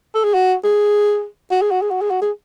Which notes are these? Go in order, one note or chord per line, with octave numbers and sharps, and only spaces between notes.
A4
G#4
F#4
G#4
F#4
G#4
F#4
G#4
F#4
G#4
F#4
G#4